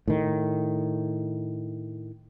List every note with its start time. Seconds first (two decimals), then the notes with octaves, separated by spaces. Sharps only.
0.08 A2 D#3